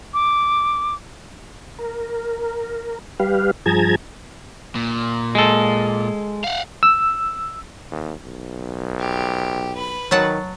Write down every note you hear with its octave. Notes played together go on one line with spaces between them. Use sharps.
D6
A#4
G3 G4 B4 F5
G2 F3 G#4 A5 A#5 G#6
A#2
G#3 A4
F5 F#5
E6
D#2
B1
G4
B4 B5
D#3 F#3 F#5 A5